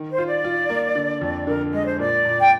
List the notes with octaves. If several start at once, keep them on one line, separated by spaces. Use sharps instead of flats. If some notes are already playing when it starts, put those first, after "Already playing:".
Already playing: D#3
C5
F4
D5
F4
A#3
D3
F2
D3 A#4
G#3 D#5
C5
A#2 D5
A#2
G5